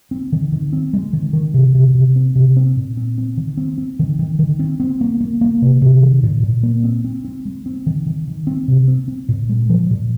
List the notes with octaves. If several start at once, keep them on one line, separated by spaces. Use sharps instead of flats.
C4
D#3
D#3
C4
G#3
D#3
D#3
C3
C3
C3
C4
C3
C4
A#2
C4
C4
D#3
C4
C4
D#3
D#3
D#3
C4
C4
A#3
A#3
A#3
C3
C3
D#3
A#2
A#2
A#3
C4
C4
C4
G#3
C4
D#3
D#3
D#3
C4
C3
C4
C4
A#2
G#3
F3
A#2